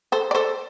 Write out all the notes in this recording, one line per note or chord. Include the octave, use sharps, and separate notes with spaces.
A4 C5
D5
A4 C5